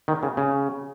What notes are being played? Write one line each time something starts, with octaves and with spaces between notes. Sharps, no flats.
D#3
C#3
C#3